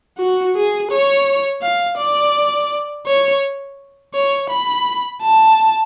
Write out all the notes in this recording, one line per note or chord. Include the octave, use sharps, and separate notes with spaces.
F#4
G#4
C#5
F5
D5
C#5
C#5
B5
A5